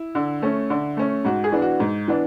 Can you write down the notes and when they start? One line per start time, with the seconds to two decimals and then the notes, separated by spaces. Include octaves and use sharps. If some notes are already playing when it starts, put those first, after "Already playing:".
Already playing: E4
0.15 D3
0.42 A3 C#4
0.70 D3
0.97 A3 C#4
1.25 G#2 F#4
1.44 G#4
1.52 E3 B3 D4
1.62 F#4
1.80 G#2
2.08 E3 B3 D4